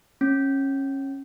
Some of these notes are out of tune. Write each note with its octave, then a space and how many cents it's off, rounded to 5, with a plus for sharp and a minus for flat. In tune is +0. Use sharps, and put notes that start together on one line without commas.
C#4 -25